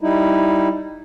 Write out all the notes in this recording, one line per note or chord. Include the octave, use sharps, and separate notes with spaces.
G3 D#4 E4